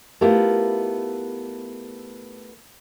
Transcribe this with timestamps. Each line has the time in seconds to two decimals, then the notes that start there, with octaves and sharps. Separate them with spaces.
0.21 A3 B3 E4 F4 G4 A#4